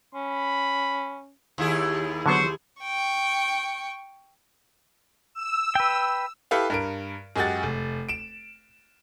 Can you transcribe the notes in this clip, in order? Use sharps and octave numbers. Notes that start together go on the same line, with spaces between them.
C#4 B5
D#2 E4 G#4
D3 F#3 B3 C5 C6 C#6
G5 C#6
E6
B4 G5
E4 G4 A4 B4 F5
G2 A#4 D7
F#2 G#3 G4 G#4 F#5 A6
F1
D7 E7